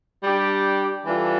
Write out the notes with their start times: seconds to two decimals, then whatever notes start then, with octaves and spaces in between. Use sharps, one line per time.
0.24 G3 D4 G4
1.06 E3 G3 D4 F4 A4